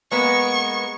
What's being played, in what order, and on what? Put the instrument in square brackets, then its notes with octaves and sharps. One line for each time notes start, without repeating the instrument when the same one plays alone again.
[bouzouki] G#3 A#3 B3 [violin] C#6